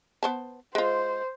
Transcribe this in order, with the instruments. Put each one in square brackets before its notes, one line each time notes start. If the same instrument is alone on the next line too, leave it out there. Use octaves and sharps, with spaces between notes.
[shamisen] B3 C5 A5
[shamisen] G#3 F4 [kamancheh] C5